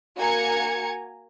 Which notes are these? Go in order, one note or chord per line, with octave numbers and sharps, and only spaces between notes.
A#3 F#4 G#5 A#5 G#6 C#7